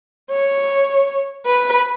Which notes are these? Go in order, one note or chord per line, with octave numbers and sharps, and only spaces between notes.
C#5
B4